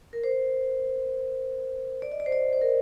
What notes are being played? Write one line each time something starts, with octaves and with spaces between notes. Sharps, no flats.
A#4
C5
D5
D#5
D5
C5
D5
C5
A#4